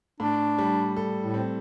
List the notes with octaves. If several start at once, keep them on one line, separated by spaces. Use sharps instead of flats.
A2 D4
G3
A4
A2
C4